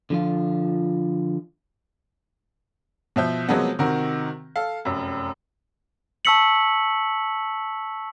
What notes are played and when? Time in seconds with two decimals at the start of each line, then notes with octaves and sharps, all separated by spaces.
0.10 D3 F3 F4
3.16 B2 F3 E5 G6
3.49 C3 F3 F#3 G#3 A#3 B3
3.79 C3 D#3 F#4 A#4
4.56 A4 F5
4.85 F1 F#2
6.25 A5 C#6 E6 B6 C#7 F#7